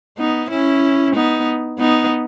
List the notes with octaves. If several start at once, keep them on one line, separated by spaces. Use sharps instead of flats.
B3 D#4
C#4 E4
B3 D#4
B3 D#4